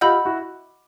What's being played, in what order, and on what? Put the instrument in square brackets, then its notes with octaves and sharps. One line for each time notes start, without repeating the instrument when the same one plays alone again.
[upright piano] F4 G4 [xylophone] D#5 F#5 B5 E6 G6
[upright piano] E4 F#4